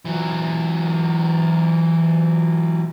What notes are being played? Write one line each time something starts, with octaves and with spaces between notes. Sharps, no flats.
E3 F#3